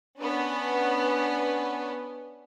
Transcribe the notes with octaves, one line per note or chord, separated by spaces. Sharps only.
B3 C#4 D4 B4